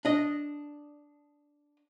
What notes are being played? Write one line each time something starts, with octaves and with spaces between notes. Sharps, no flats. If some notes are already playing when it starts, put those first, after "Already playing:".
D4 D#5